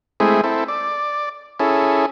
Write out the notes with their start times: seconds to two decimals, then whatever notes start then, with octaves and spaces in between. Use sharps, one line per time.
0.20 G#3 A3 C4 E4 G#4
0.44 C4 E4 A4
0.68 D5
1.60 C#4 E4 G#4 A4